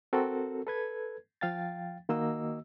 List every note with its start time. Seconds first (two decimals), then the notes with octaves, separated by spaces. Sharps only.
0.13 C4 F#4 A4 A#4
0.67 A4 B4 G#6
1.41 F3 F5 G5 A6
2.09 D#3 A#3 F#4 D#5 E6